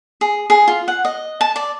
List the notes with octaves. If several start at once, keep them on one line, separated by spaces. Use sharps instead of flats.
G#4
G#4
F4
F#5
D#5
A5
D5